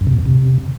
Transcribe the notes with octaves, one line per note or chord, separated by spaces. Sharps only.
F#2
C3
A#2
F2
C3